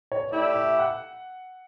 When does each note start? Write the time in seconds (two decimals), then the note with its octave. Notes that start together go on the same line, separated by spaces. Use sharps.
0.12 C#5
0.30 A3 E4 G4 D5
0.55 E5
0.79 F#5